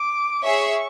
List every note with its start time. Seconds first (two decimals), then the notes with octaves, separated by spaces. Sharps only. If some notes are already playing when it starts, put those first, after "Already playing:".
Already playing: D6
0.44 G#4 C#5 E5 C#6